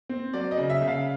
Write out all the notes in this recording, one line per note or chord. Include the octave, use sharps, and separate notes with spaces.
C4
F#3 D5
D#5
C#3
E5
C#3
F5